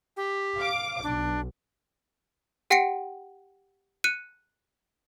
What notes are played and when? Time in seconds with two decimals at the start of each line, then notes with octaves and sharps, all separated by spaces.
0.17 G4
0.57 F5 D6
1.03 B1 D4
2.70 G4 F#5 G5 A#6 C#7 D7
4.04 F#6 C#7 D#7